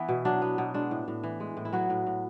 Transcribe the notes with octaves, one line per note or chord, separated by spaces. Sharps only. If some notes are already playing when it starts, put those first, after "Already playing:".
Already playing: E3 B3 E4
B2
F#3 D4
B3
B2
G#3 D4
A2
A2
E3
G#3
A2
E4
F#3 B3 F#4
A2
A2